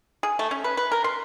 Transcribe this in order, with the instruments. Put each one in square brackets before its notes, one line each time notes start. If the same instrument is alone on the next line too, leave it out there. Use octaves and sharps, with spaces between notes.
[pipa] G#4
A3
C#4
B4
B4
A#4
C6